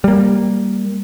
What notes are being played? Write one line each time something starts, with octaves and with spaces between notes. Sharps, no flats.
G3 A#3